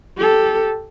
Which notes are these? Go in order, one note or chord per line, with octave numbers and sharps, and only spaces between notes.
G4 A4